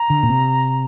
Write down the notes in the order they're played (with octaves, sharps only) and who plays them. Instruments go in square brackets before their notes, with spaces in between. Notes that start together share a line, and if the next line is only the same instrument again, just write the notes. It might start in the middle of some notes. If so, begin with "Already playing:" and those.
Already playing: [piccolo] A#5
[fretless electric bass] D3
A#2
C3